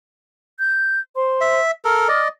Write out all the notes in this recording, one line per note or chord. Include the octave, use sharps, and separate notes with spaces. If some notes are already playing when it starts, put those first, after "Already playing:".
G6
C5 C6
E5
A4 A#4 F6
D5 D#5